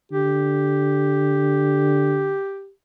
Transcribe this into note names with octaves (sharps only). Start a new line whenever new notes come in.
D3 G4